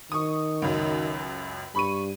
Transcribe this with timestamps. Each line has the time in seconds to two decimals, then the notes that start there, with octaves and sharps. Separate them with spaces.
0.12 D#3 C#6 D#6
0.62 C#2 F#2
1.75 G2 B5 C#6 D#7